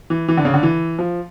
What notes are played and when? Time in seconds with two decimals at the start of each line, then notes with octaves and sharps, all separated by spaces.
0.10 E3
0.28 E3
0.37 D3
0.45 C#3
0.54 D3
0.63 E3
0.99 F3